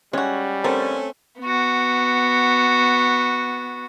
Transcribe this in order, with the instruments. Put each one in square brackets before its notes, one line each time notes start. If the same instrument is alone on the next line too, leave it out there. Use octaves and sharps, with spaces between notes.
[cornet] G3 [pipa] G#3 F#4 [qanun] C#4
[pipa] D3 A#4 A5 [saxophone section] A3 C#4 [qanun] C4
[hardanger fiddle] B3 F#4